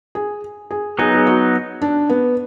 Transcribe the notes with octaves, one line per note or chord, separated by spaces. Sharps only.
G#4
G#4
F#3 B3 D#4 G#4
G#4
F#4
D4
B3